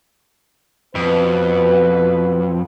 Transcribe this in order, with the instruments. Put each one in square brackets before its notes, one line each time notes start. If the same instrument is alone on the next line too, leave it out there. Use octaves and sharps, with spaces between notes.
[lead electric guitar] F2 [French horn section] B2 B4